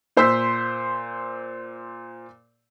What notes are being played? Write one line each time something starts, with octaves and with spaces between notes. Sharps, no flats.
A#2 C5 C6 E6 B6